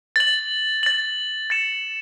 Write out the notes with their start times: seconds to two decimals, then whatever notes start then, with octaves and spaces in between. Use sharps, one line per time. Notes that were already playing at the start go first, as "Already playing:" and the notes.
0.16 A6 F#7
0.83 A6 F#7
1.50 A6 C#7 E7